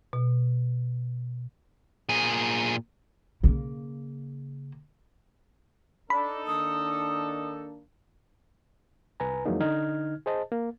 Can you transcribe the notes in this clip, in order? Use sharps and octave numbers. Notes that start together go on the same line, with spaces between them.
B2
A#2 G#4
C#3 A#3
D4 D#4 A4 B5
D#3 A#3 D4 D#6
C2 B4 G#5 A#5
F2 E3 F#3 G#3 A#3 D#4
D3 D#4 F6 G#6
G#4 C5 D#5 A5
A#3